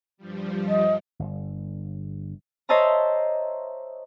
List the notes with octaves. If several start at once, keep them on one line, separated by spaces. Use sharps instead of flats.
G2 F3 G3
D#5
G1
C5 C#5 D#5 E5 A5 A#5